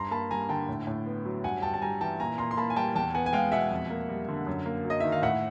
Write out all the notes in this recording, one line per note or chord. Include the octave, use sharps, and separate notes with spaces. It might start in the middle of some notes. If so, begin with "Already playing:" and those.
Already playing: G2 A#5 C6
A#3 A5 B5
G3 G#5 A#5
D3 G5 A5
A2
A2
B3
F#3
G2 F#5 G#5
G2 G5 A5
A5
G3 G#5 A#5
E3 G5 A5
A#2 G#5 A#5
A#2 A#5 C6
C6
A#3 A5 B5
G#5
G3 G5 A5
E2 G5 A5
B3 F#5 G#5
G#5
G#3 F5 G5
B2 E5 F#5
F2
A#3
G3
D3
F#2
A#3
F#3
D#5
D#3 E5
F5
A2 E5 F#5